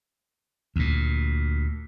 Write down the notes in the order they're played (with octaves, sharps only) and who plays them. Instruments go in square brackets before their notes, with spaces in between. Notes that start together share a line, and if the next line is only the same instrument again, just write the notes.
[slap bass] D2 A#2